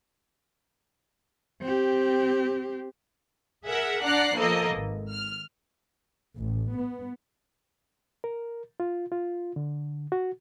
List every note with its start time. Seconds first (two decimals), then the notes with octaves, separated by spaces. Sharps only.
1.61 C4 G4
3.67 G#4 A#4 E5 F#5
4.05 D4 D5 F#5 A#5 F#6 C7
4.35 F3 A#3 B3 A4 D#5
4.75 G#1
5.11 F6
6.36 A1
6.74 B3
8.24 A#4
8.80 F4
9.12 F4
9.56 D3
10.12 F#4